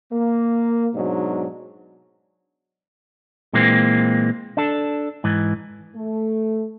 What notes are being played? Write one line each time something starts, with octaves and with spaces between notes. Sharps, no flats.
A#3
G#2 B2 F#3 D4 D#4
A#2 E3 G#3 A#3 C4
D4 A4
G#2 E3
A3